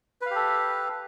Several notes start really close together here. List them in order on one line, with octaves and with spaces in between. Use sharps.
B4 F5 G4 A4